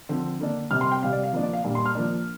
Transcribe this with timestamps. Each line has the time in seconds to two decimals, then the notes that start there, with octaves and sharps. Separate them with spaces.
0.09 D3 F3 C4
0.41 D3 A#3 D4
0.71 C3 G3 C4 F6
0.81 C6
0.92 G5
1.02 C3 G3 C4 F5
1.12 D5
1.24 F5
1.33 F3 A#3 D4
1.43 D5
1.53 F5
1.64 A#2 G3 D4
1.75 C6
1.86 F6
1.95 F3 A#3 D4